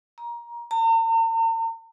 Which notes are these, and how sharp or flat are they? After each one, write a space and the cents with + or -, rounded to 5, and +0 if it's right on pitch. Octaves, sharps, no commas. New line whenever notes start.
A#5 +20
A#5 -45